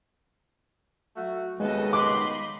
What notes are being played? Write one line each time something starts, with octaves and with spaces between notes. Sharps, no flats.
F#3 A3 F#4
D#2 C#3 G#3 B3 A4 D#5
D#4 B5 C6 D6